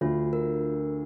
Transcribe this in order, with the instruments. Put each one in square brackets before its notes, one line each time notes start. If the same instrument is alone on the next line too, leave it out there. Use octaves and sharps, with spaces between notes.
[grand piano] D2 D3 [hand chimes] F4
[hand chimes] A#4